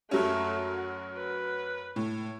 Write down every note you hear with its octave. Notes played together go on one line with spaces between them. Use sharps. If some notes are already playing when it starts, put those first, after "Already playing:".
F#2 F#3 A3 C#4
F#4
B4
A2 C#5